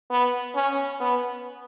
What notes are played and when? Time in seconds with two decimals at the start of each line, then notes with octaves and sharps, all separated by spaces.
0.10 B3
0.55 C#4
1.00 B3